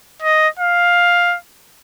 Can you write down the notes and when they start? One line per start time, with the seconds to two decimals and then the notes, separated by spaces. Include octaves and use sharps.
0.22 D#5
0.59 F5